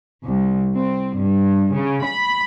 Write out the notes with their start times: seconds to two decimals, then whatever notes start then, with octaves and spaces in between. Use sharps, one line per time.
0.24 C2
0.75 C4
1.19 G2
1.73 C#3
2.07 B5